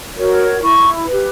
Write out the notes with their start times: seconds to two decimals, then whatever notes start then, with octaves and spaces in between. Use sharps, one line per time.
0.15 F#4 A#4 C#5
0.61 E4 C#6
1.07 G4 B4